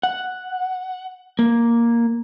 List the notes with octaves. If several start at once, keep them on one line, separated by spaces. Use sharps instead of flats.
F#5
A#3